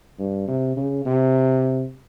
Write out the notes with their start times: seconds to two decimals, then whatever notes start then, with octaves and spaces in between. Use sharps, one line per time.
0.19 G2
0.48 C3
0.77 C#3
1.05 C3